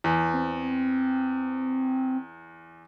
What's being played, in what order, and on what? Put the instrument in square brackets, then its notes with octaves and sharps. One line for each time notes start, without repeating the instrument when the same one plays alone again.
[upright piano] E2
[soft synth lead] C4